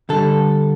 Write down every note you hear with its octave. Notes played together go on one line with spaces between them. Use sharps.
D3 G3 A4